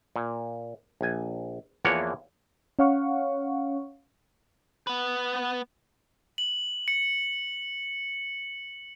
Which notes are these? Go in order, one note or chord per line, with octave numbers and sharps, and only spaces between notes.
A#2
A#1 G#5
E2 E3 F3 A#3 C#5 F#5
C#4 C#5 F5 F#5 C#6
B3 B4
F#7
C#7